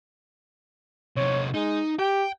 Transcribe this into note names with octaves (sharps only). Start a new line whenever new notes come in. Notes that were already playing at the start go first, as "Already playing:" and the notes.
C3 D#4 C#5
G#3 D#4
G4 G5